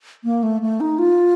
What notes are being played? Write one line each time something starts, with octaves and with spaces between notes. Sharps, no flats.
A#3
A3
A3
D#4
F4